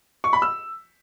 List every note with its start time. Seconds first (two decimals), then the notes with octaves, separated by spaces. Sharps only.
0.24 C#6
0.33 B5
0.42 E6